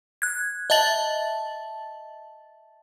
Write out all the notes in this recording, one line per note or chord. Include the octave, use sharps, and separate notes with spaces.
F#6 G#6
D#5 E5 A5 A6 F#7